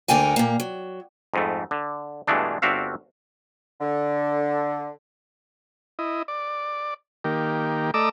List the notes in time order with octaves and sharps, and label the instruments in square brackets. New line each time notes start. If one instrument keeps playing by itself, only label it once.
[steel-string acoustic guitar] D2 D3 A#3 A#4 G5 G#5
A#2 A#3
F#3
[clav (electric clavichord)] F2 G#2 A3
D3
G2 B2 E3 G#3 A3 D4
G1 C4 D4 F#4 E5 F5
[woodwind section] D3
[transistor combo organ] E4 D#5
D5
D#3 A#3 G4
A3 D5 D#5 A#5 D6 E6